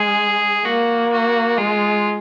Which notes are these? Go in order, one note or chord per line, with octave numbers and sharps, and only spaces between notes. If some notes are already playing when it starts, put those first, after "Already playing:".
Already playing: G#3 G#4
A#3 F#4
F#4
G#3 F4